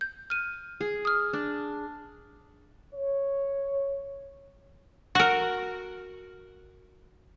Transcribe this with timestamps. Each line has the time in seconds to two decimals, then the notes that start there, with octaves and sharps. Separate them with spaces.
0.01 G6
0.30 F6 D#7
0.81 G#4
1.05 D#6 F6
1.33 D4
2.94 C#5
5.15 F#4 A#4